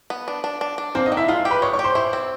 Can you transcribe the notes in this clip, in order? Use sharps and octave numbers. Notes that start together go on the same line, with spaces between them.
B3
D4
D4
D4
D4
A#3 C4 C5
D#4 D#5
D#3
E4 E5
G#3 F4 F5
G4
B4 B5
G#3 C#5 C#6
C#5 C#6
G4
C5 C6
E4 C5 C6
C4